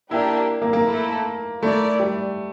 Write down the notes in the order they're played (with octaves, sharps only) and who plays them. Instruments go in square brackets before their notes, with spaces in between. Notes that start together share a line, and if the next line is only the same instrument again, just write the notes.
[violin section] A#3 D4 G4 [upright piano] E4
[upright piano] A#3
A#3
[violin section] A3 E4 A4
[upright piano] A3 [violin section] E4 A#4 D5
[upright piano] G3